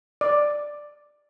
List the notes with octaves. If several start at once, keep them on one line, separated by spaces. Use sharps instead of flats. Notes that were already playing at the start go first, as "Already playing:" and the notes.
D5